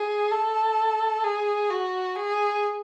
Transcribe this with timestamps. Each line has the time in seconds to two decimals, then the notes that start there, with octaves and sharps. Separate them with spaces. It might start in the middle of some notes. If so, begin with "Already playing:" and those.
Already playing: G#4
0.31 A4
1.24 G#4
1.70 F#4
2.16 G#4